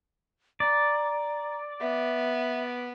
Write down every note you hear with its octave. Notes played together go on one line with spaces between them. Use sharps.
D5 A#5
B3 E5